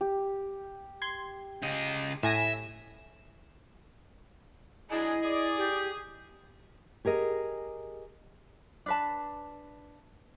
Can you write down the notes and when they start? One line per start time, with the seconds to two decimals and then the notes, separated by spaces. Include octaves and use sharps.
0.01 G4
1.02 C6 G#6
1.63 C#3 D#5
2.23 A2 E5 G#5 A#6
4.90 F#3 D4 E4 G#4 D#5
5.23 G#4 D5
5.57 G4
7.05 G4 G#4 A#4 D#5
8.86 D4 B4 A5